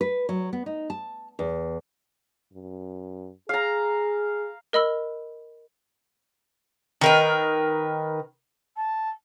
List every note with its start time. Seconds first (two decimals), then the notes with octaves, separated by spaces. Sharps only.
0.01 B4
0.29 F#3
0.53 B3
0.66 D#4
0.90 A5
1.39 E2
2.53 F#2
3.49 G#4 F5 A#5
4.73 A#4 D#5 B5 E6
7.01 D#3 A#4 B4
8.76 A5